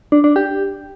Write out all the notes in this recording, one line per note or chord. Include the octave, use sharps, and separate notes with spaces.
D4
D4
G4